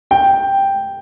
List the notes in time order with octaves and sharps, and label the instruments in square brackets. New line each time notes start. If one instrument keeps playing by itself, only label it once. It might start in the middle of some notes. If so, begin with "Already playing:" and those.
[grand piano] G5